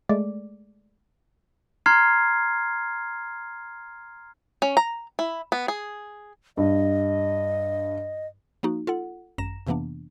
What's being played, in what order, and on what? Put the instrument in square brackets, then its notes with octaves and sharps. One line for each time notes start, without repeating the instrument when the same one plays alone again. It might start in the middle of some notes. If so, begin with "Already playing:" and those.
[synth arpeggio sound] G#3 A3 D5
[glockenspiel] A#5 C6 F6 G#6 C7
[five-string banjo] C#4
A#5
E4
B3
G#4
[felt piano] G2 [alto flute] D#5
[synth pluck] F3 A#3 D#4 F#4
F4 A4 F#5
G#1 F#2 A#5 A#6 E7
F2 C3 E3 A#3 B3 D4